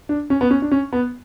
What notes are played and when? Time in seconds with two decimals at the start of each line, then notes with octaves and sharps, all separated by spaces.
0.09 D4
0.30 C#4
0.41 B3
0.51 C#4
0.62 D4
0.71 C#4
0.93 B3